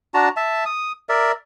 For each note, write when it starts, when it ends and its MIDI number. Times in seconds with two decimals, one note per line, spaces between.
0.14 0.29 62
0.14 0.29 66
0.14 0.29 81
0.14 0.29 82
0.37 0.64 76
0.37 0.64 81
0.66 0.92 87
1.09 1.32 70
1.09 1.32 74
1.09 1.32 76